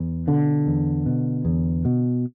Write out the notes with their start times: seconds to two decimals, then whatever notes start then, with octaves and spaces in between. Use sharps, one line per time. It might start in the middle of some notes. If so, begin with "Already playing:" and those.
Already playing: E2
0.27 B2 D3
0.67 E2
1.06 B2
1.45 E2
1.85 B2